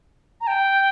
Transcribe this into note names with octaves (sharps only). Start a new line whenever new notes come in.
A#5
G5